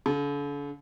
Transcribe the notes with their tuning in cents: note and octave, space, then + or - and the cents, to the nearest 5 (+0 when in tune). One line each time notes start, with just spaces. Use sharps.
D3 -40